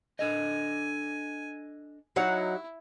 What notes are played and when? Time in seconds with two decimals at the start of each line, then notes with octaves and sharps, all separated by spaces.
0.19 D4 A4 D#5 G#5
2.16 F#3 D#4 E4 F#5